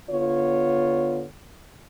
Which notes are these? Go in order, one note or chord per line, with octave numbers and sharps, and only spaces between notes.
D3 B3 F4 C#5